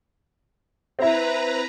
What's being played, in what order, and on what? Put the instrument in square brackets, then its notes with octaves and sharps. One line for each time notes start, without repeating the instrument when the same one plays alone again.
[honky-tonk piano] C4 E4 [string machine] B4 A#5